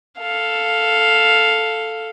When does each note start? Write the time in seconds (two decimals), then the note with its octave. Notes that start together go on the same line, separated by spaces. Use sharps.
0.19 A4 F5